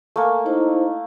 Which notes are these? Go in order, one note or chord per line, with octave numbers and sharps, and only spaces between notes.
A3 A#3 A#4 G#5
D#4 E4 C5